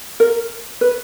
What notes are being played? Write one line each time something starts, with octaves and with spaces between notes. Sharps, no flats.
A#4
B4